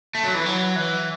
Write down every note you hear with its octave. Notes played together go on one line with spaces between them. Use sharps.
A3
F#3
E3
F#3
E3